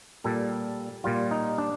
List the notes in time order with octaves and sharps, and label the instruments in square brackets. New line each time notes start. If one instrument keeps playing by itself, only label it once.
[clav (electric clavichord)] A#2 G3 A4
A#2 G3 F4
D#4
D4